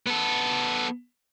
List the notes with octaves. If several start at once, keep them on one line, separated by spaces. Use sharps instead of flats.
B3 A4